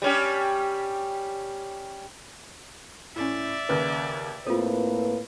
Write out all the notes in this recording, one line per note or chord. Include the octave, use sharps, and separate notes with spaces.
G3 C#4 G4
A2 C#4 D5 E5
D#2 C#3 B4
A2 A#3 C4 F4 A4 B4